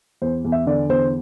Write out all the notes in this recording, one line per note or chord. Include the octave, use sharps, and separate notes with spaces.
E2 C5
E2
E5
D3 D5
E2 C5